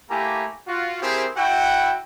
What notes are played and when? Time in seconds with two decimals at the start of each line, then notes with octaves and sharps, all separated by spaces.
0.11 A3 A#3 E4 G4 G#5 A#5
0.68 F4 F#4
1.03 C4 E4 G4 G#4 A#4 C5
1.37 E4 F#4 F#5 G5